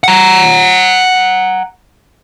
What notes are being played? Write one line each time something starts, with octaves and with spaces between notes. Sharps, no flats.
F#5 A#5